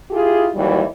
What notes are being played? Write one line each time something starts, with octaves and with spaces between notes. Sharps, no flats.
E4 F4 G4 G#4
D#2 E3 F#3 G3